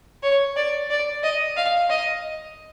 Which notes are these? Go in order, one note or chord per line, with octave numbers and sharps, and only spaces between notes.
C#5
D5
D5
D#5
F5
D#5